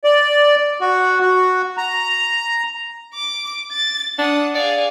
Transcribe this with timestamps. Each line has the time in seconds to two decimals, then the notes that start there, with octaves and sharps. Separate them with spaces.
0.04 D5
0.81 F#4
1.20 F#4
1.78 A#5
3.14 D6
3.72 A6
4.18 D4 F#5 D#6
4.55 G#4 D5 F5